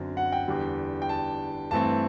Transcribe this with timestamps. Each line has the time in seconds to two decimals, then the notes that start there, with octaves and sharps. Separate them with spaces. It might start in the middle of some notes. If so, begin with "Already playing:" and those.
Already playing: F#2 D3 C4
0.17 F#5
0.32 G5
0.48 E2 D3 G3
1.02 G5
1.09 A5
1.71 G2 E3 A3 C4 A5